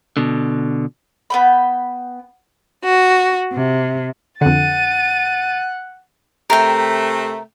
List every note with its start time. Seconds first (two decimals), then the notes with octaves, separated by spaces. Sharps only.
0.17 B2 D3
1.30 B3 G5 B5
2.83 F#4
3.53 C3
4.41 F2 D3 F#5 A6 D#7
6.50 C3 A3 A#4 G5